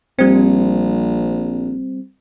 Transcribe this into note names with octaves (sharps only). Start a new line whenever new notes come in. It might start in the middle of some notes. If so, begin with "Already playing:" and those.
A#1 G3 C4